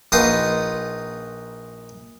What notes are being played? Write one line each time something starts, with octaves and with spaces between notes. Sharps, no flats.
A#1 D#4 F4 B4 F#5 C6